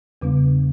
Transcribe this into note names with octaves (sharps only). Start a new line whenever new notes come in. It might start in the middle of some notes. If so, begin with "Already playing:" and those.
E2 C#3 G3 B3 D4